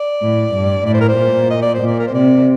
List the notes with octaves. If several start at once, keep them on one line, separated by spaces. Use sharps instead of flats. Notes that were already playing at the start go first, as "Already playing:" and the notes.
Already playing: D5
A2
G2
A2 D5
C5
A#4
C5
A#2
D#5
D5
C5
A#2 D5
A#4
C5
C3 D5